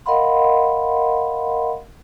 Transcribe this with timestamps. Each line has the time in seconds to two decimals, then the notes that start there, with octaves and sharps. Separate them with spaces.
0.06 A#4 D#5 F5 F#5 B5 C6